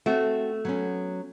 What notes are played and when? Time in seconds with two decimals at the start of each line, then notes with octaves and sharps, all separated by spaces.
0.06 A3 C4 F#4
0.65 F#3 B3 C#4